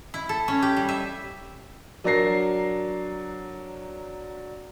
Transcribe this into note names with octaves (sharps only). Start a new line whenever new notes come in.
E4
A4
C#4
G4
G3
E5
F#3 D4 A#4 A#6 C7